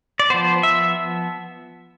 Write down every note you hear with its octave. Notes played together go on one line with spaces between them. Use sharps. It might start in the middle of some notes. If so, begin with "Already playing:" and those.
D5
F3 B3 C5
E5